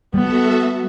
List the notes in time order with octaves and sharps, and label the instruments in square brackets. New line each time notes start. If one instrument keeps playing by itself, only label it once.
[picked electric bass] G3 [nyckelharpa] B3 [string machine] F#4 A4 E5